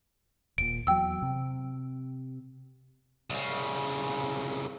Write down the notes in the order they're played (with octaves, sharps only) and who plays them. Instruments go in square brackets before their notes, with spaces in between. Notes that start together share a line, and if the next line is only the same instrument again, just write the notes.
[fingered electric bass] D#1 A#2 [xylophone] D7
[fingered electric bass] E2 F#3 [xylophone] G5 E6
[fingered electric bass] C3
[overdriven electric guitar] C2 C#3